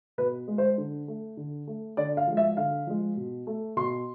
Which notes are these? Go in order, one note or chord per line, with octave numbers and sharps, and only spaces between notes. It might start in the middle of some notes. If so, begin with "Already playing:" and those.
B2 B4
G#3
C5
D3
A3
D3
A3
D3 D5
F5
F3 G#3
E5
D3 F5
F3 G#3
B2
A3
B2 C6